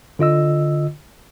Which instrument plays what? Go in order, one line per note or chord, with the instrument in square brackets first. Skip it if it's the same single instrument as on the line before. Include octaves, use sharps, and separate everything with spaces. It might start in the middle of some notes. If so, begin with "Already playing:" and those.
[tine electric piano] D3 F4 D#5 E6